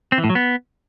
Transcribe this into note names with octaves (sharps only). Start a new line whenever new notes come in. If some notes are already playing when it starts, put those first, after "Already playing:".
C4
E3
A2
F#3
B3